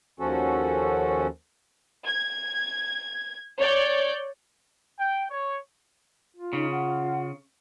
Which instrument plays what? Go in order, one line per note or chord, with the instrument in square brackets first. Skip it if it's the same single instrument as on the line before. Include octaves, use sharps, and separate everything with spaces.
[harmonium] D#2 F3 C#4 F#4 A4
[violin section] G#6
C#5 D5 G6
[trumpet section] G5
C#5
[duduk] F4
[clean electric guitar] C#3 [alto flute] D#4
[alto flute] F#5